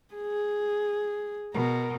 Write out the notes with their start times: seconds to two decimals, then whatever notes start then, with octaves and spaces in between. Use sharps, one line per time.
0.15 G#4
1.54 B2 A#4